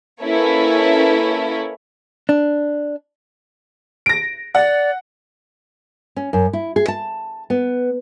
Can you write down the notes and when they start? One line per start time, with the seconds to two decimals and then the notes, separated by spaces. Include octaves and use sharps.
0.22 A#3 C#4 E4 A4 B4 C#5
2.29 D4
4.06 A#6 D7
4.55 D5 F#5
6.16 C#4
6.33 F#2
6.53 E4
6.76 G#4
6.88 A5
7.50 B3